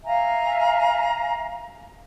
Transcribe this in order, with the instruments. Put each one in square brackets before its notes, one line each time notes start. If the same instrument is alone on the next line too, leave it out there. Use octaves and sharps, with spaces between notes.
[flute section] E5 F5 G#5 A#5